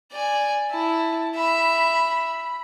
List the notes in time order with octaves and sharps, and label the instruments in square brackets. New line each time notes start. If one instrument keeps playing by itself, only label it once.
[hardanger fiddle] D5 G#5
[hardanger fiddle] E4 [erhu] A5
[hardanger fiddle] E5 [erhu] B5